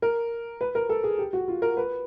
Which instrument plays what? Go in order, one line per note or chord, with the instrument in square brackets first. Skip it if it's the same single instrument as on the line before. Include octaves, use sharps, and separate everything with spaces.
[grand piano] A#4
B4
A#4
A4
G#4
G4
F#4
F4
A#4
B4